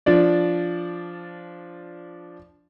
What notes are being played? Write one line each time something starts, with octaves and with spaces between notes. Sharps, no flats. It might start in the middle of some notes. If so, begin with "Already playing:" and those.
F3 D4 D5